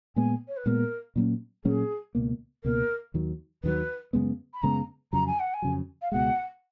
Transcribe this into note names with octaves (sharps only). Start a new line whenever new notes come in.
A#2 G#3 B3 G#5
C#5
B4
A#2 G#3 B3 A#4
A#2 F#3 A#3 C#4
A#2 F#3 A#3 C#4 G#4
C#2 B2 A#3
C#2 B2 A#3 A#4
D#2 D#3 F#3
D#2 D#3 F#3 B4
F#2 C#3 G#3 B3
B5
F#2 C#3 G#3 B3 A#5
F2 C#3 F#3 A#5
G#5
F#5
G#5
F2 C#3 F#3
F5
C#2 B2 G#3 F#5